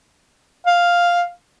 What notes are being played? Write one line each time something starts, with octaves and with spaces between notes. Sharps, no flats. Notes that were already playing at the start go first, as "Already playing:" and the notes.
F5